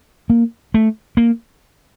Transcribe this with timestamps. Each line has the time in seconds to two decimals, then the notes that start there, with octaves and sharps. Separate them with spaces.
0.30 A#3
0.74 A3
1.17 A#3